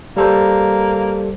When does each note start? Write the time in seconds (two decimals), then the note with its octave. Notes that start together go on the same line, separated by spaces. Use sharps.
0.17 G3 A#3 A4 C5